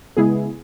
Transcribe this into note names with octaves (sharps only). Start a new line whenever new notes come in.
C#3 G#3 B3 E4 G#4